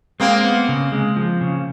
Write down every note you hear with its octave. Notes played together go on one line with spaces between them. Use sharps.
G#3 A#3 C4
B3
C#3
G#3
F3
C#3